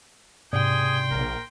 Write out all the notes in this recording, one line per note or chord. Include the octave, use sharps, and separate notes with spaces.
G#2 C3 D4 G#4 D5 G5 C6
A#1 A#2 A#4